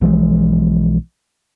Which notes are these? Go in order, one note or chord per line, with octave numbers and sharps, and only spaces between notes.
B1 E3 F3 G#3